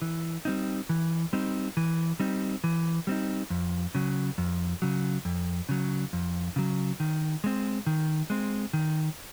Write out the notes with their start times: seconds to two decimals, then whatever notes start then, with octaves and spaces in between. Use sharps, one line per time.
0.02 E3
0.45 G3 C4 D#4
0.89 E3
1.33 G3 C4 D#4
1.77 E3
2.20 G3 C4 D#4
2.64 E3
3.07 G3 C4 D#4
3.50 F2
3.95 C#3 F#3
4.38 F2
4.82 C#3 F#3
5.25 F2
5.69 C#3 F#3
6.13 F2
6.56 C#3 F#3
7.00 D#3
7.44 G#3 C4
7.86 D#3
8.30 G#3 C4
8.73 D#3